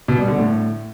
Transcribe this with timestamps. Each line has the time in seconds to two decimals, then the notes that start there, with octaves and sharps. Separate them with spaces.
0.08 B2
0.18 G3
0.28 D3
0.38 A2